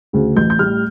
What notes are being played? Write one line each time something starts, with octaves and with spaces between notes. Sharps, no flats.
D2 C#3
A1 G6
G6
A2 G3 F6